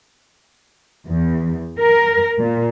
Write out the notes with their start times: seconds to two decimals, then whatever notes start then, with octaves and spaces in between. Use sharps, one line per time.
1.08 E2
1.79 A#4
2.40 A#2